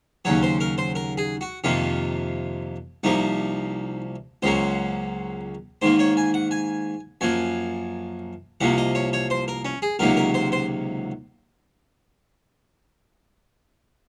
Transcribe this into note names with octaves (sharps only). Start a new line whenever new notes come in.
D#2 C#3 F#3 C#5
C5
A#4
C5
A#4
G#4
F#4
F2 C3 D#3 A#3 F4
C2 C3 F3 A#3 D#4
C#2 C#3 F#3 A#3 C5
G#2 D#3 A#3 C5
C#5
G#5
F#5
G#5
F#2 F3 A#3 G#5
C2 C3 F3 A#3 F#5
D#5
C#5
C#5
C5
A#4
C#4
G#4
C#2 C3 D#3 F#3 A#3 A#4
A#4
C5
C5